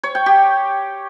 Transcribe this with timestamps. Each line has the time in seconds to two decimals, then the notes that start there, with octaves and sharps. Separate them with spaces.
0.03 C#5
0.15 G5
0.26 G4